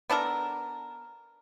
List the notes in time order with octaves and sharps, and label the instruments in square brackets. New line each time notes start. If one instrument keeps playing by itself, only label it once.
[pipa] B3 D4 A4 A#4